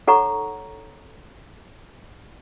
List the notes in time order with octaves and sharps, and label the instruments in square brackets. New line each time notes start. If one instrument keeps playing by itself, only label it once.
[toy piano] D#4 A4 C#5 F#5 A#5 C#6